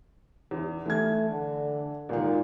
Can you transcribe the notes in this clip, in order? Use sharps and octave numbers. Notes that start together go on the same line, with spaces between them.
E2
E3 A3 G#6
D3
G#1 A#2 D#3